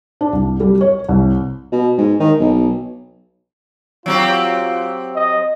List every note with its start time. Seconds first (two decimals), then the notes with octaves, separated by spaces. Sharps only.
0.21 D4
0.33 C2
0.60 G3
0.81 C#5
1.09 C2
1.72 B2
1.98 G#2
2.20 D#3
2.39 B1
4.06 F#3 C4 F4 G4
5.15 D#5